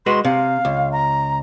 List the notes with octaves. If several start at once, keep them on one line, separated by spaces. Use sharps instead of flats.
G#3 F#4 B4 C6
C3 F5
C#2
A#5